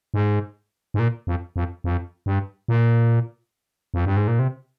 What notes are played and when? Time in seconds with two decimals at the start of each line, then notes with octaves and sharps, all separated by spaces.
0.14 G#2
0.94 G#2
0.99 A#2
1.27 F2
1.56 F2
1.84 F2
2.26 G2
2.68 A#2
3.94 F2
4.05 G2
4.17 G#2
4.28 A#2
4.39 C3